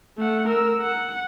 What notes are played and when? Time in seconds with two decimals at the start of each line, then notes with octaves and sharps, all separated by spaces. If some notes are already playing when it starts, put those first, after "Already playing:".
0.18 A3 F#5
0.48 A#4 E6
0.81 F#5